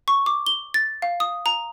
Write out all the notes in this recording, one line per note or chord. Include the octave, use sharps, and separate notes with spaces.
C#6
D6
G7
A6
F5
D#6
A#5